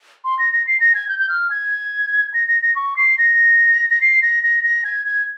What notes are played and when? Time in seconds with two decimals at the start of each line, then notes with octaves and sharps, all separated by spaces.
0.24 C6
0.39 A#6
0.53 A#6
0.67 C7
0.80 A#6
0.95 G#6
1.09 G6
1.19 G6
1.29 F6
1.50 G#6
2.34 A#6
2.48 A#6
2.62 A#6
2.76 C#6
2.96 C7
3.18 A#6
3.90 A#6
4.01 C7
4.22 A#6
4.43 A#6
4.64 A#6
4.85 G#6
5.06 G#6